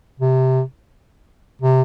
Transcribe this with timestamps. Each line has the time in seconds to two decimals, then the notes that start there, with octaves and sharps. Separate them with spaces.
0.20 C3
1.62 C3